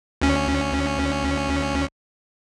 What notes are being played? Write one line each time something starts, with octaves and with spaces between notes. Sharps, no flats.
D2 C#4